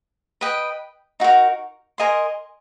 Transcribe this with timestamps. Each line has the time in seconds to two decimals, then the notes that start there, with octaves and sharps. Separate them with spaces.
0.41 B4 D#5 G5
1.20 D#4 F#4 A#4
1.98 A#4 D#5 G#5 C6